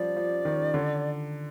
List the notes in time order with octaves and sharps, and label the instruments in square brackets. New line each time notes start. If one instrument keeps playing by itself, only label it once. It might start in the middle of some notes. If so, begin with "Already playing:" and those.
Already playing: [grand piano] F3 G3 [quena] D5
[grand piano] F3
D#3
D3